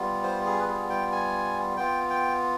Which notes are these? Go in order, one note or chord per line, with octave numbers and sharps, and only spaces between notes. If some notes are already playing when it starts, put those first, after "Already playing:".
Already playing: G3 B3 F4
C5
G#4
B4
G#4
G5
G#5
B3 F4 G5
G5